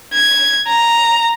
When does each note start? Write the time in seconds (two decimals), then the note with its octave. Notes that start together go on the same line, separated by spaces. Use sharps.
0.14 G#6
0.68 A#5